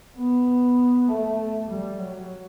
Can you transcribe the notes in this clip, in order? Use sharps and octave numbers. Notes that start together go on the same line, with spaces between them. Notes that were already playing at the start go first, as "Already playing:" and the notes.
B3
A3
G3
F#3